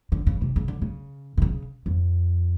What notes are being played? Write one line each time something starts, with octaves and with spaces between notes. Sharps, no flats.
D3
C#3
C3
C#3
D3
C#3
C3
C#3
F2